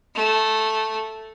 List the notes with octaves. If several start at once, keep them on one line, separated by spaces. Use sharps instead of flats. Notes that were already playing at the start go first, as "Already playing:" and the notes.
A3